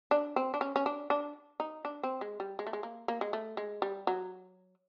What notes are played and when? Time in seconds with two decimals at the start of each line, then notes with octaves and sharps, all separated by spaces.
0.11 D4
0.36 C4
0.54 D4
0.61 C#4
0.76 C#4
0.86 D4
1.10 D4
1.60 D#4
1.85 D4
2.03 C4
2.21 G#3
2.40 G3
2.59 G#3
2.67 A3
2.73 G#3
2.83 A#3
3.08 A#3
3.21 G#3
3.33 A3
3.57 G#3
3.82 G3
4.07 F#3